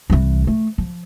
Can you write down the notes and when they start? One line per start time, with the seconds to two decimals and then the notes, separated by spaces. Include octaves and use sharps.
0.10 C2 E3
0.47 A3
0.78 F3